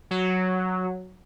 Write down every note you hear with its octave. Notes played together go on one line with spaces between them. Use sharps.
F#3